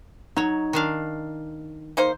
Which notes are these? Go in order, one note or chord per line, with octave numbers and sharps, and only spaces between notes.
F#3 D#4 C#5
D#3 D4 F5
A#3 D#4 C5